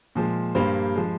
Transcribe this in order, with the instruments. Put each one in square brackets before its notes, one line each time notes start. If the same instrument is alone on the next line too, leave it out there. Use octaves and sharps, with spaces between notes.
[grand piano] A#2 F3 G#3
G2 G3 A#3 C5
F3 G#3